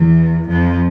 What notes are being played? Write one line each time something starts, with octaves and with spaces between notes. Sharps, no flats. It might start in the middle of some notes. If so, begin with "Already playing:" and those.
Already playing: E2 E3
F2 F3